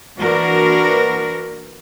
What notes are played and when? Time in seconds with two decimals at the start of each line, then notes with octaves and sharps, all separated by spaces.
0.17 E3 A#3 D4 F#4 A#4 B4